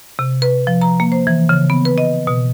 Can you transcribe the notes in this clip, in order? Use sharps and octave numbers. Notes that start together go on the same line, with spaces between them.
C3
B4
F3
A#5
A#3
C5
E3
C#3
B3
B4
D#5
B2